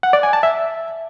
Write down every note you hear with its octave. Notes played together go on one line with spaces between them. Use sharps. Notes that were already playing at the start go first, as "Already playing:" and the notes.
F#5
D5
G#5
A5
E5